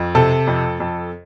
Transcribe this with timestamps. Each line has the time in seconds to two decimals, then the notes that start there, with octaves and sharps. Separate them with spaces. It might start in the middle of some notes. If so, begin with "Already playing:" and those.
Already playing: F2
0.15 C3 A4 A5
0.47 F2
0.80 F2